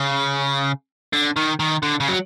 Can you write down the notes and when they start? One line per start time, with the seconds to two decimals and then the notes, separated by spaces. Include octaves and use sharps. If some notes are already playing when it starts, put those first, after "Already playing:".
Already playing: C#3
1.13 D3
1.37 D#3
1.60 D#3
1.83 D3
2.00 C#3
2.09 F#3